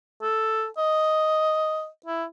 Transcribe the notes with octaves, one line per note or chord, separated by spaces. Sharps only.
A4
D#5
E4